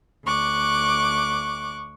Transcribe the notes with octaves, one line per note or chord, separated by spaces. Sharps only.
D2 C#6 D6 F#6